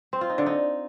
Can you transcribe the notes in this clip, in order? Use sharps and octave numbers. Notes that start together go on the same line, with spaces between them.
C4
F4
D#4
D3
D#4